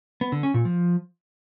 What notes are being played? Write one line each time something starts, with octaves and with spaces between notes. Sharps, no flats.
B3
D3
C#4
A#2
F3